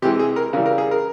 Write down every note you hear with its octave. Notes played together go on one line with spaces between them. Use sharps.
C3 E3 G#3 G4
G#4
A#4
C#3 E3 G3 A#4
A#4
G#4
A#4